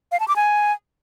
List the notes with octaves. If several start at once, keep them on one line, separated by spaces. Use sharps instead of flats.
F5
A5
D6
G#5